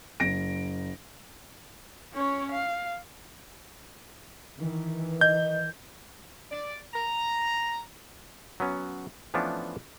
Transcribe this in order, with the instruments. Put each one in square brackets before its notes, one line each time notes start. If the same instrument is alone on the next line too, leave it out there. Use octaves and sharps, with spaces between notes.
[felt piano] F#1 A#6 D7
[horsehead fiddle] C#4 C#5
F5
[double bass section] D#3 E3
[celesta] D#5 [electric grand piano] G6
[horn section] D5
A#5
[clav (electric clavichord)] F#3 B3 C#4
E3 F3 A3 B3 C#4 D4